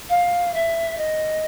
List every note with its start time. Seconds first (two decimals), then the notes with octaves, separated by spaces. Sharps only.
0.09 F5
0.54 E5
0.98 D#5